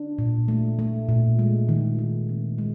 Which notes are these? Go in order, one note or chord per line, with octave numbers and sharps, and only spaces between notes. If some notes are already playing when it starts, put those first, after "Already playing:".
Already playing: D4
A#2
A3
A3
A#2
G#3
D#3
D#3
C4
G#3